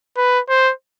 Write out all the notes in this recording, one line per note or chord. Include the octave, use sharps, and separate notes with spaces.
B4
C5